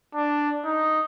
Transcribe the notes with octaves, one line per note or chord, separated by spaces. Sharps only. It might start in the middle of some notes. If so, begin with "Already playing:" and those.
D4
D#4